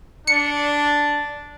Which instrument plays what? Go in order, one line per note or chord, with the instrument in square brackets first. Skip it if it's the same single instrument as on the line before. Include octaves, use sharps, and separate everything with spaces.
[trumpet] D4 [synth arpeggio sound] C#7